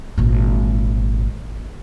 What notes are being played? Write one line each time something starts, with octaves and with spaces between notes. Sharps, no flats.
G#1 A#2